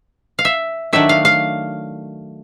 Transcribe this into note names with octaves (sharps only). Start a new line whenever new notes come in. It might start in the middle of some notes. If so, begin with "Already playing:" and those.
F5
E5
D#3 F#3 A3 D4 E5
F5
F5